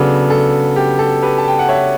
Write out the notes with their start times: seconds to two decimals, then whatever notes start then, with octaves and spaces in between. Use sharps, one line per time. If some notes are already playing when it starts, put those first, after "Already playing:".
Already playing: C#3 F#3 B3 D4 A4
0.30 A4
0.76 G4
0.99 A4
1.22 G4 B4
1.38 A5
1.48 G5
1.59 F#5
1.69 C#5 E5